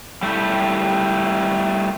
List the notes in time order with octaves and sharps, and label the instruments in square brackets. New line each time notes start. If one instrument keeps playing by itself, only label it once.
[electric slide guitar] G3 A3 E4 G4